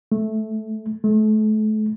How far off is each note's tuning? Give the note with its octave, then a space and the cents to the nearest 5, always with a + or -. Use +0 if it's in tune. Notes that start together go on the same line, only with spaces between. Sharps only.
A3 -10
A3 -35